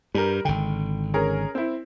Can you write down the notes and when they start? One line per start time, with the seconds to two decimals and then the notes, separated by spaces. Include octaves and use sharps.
0.15 G2 G3 A#4
0.45 G#1 D3 G5
1.14 C#4 G#4 A#4
1.55 C4 E4